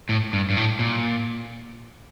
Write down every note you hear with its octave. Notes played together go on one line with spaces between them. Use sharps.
A2
G2
G2
A2
A#2